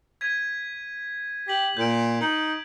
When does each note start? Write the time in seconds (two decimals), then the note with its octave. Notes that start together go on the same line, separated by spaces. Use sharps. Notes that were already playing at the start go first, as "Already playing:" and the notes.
0.21 G#6 B6 D#7
1.48 G4 B6 F#7
1.77 A#2 G6 D7
2.21 D#4 F#7